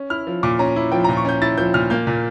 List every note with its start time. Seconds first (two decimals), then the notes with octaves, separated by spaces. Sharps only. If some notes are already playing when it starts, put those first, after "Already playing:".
Already playing: C#4
0.10 E4 F6
0.27 F3
0.43 A#2 D6
0.59 C#4 A#5
0.76 E4
0.92 F3 G5
1.04 A#5
1.08 A#2
1.17 C#6
1.25 C#4 G6
1.42 E4 A6
1.58 F3 G6
1.74 A#2 F6
1.90 A#3 G6
2.07 A#2